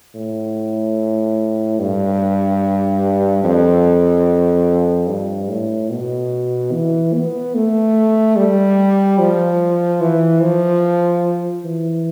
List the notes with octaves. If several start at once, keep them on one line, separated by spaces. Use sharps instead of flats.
A2
G2
F2
G2
A2
B2
E3
B3
A3
G3
F3
E3
F3
E3